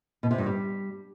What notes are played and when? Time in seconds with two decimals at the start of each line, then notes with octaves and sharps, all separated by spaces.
0.23 B2
0.31 C3
0.38 G2
0.46 G3